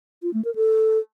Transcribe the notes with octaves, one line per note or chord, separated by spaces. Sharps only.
F4
A3
A#4
A4